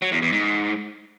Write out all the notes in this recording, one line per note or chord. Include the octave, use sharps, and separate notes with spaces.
F#3
E2
E2
G#2